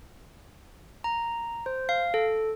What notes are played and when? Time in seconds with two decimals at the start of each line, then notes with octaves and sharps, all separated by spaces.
1.04 A#5
1.66 C5
1.89 F5
2.14 A4